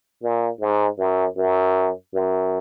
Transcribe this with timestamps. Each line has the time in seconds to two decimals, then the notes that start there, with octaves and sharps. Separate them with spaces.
0.22 A#2
0.60 G#2
0.99 F#2
1.37 F#2
2.14 F#2